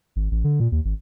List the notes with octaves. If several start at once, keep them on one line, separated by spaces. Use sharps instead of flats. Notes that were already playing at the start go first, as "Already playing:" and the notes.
G#1
A1
D3
A#2
D#2
G#1